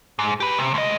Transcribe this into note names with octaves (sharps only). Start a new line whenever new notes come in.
G#2
G4 B4
C3
D2 D#5